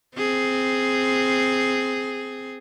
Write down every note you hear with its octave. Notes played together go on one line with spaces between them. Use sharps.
C4 G#4